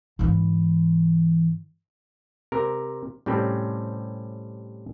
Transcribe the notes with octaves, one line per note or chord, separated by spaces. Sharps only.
G#2 E3
C3 A#4
A2 C3 G3 C4 C#4